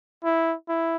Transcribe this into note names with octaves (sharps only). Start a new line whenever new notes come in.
E4
E4